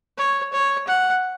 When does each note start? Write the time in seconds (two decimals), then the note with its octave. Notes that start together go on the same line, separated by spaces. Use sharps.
0.17 C#5
0.53 C#5
0.87 F#5